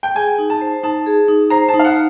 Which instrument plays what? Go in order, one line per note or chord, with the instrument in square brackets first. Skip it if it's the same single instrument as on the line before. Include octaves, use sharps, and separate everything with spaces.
[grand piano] G5
[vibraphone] G#4 [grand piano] G#5
[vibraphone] D#4
[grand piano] A5
[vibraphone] C5
[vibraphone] D#4 [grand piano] A5
[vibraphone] G#4
D#4
[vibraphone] C5 [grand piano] A#5
[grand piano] A5
[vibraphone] D#4
[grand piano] F5
F#5